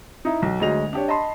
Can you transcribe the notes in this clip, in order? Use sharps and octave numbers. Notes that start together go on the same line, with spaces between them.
D#4 E4
B1
D2 F#3 G#3 D#5 F7
D4 G4 C#5
D#5 A5 B5 C6